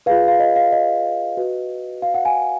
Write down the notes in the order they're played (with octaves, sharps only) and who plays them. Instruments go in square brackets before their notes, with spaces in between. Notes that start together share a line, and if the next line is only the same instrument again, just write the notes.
[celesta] F4 G#4 B4 F5
F5
D#5
F5
D#5
F#4 B4
F5
F#5
G#5